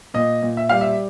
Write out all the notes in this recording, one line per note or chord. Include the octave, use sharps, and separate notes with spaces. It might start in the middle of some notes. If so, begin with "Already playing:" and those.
A#2 D#5
A#2
E5
G3 F5
E5